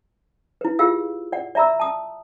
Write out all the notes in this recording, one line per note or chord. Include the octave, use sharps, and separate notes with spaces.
E4 B4
F4 G4 G#4 F5 E6
D5 F#5
D5 E5 A#5 B5 E6
A5 D#6